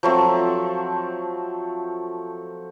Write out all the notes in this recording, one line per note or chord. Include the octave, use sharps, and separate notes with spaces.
F3 F#3 A3 C4